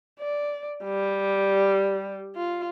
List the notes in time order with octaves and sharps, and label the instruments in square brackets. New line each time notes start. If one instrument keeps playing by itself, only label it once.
[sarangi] D5
G3
F4